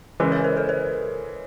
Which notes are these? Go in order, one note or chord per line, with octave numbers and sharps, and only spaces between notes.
C#3 E3 G#3 G#4 A#4
B4 C#5
A#4 C5
A4 B4
A#4 C5